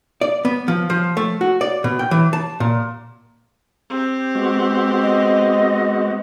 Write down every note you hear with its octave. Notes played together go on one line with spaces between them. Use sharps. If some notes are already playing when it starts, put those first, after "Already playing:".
D5
B3
F3
F3
A3
F#4
D5
B2
G5
E3
A5
A#2
C4 G4
G#3 B3 F#4
D#5